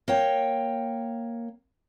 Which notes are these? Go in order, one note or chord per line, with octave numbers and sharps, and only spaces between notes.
A#3 C#5 G5